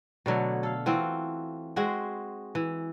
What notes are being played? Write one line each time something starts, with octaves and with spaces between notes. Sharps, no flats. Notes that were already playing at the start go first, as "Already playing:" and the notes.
B2 D3 F#3 A3
A4 F5
E3 C4 F4 F#4
G#3 C4 F#4 G#4
E3